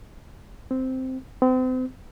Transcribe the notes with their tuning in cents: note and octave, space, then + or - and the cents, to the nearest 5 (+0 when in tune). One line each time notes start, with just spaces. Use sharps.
C4 -5
C4 -35